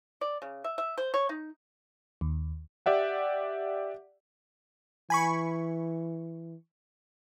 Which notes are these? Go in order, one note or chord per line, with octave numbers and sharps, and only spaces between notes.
D5
C#3
E5
E5
C5
C#5
D#4
D#2
G4 D5 E5 F#5
E3 G#5 B5 C#6